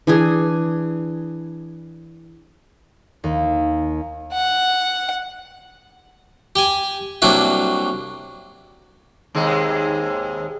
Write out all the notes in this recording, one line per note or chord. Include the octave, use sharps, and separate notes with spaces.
E3 D4 G#4
D#2
F#5
G4 G5 G#5
C2 F#3 A#3 D4 F#4 E5
D#2 C3 G#3